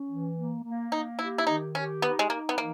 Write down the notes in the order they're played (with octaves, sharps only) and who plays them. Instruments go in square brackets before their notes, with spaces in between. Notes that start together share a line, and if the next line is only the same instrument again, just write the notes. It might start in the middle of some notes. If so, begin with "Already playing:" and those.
Already playing: [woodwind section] C#4
E3
A#3
A#3
[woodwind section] A#3 [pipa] D#4
[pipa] E4 [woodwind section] G4
[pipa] E4
[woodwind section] D#3 [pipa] D#4
[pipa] C#4 [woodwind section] G4
[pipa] B3 [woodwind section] D#4
[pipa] G#3
[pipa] A#3 [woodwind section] D#4
[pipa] B3
[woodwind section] E3 [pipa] A#3